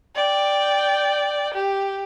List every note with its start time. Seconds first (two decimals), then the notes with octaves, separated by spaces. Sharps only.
0.15 D5 G5
1.54 G4